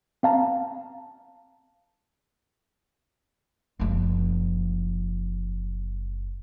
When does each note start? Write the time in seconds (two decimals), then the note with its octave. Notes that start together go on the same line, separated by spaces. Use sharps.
0.23 C4 F5 A5 A#5
3.79 F#1 F3